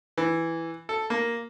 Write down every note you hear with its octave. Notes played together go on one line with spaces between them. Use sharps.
E3
A4
A#3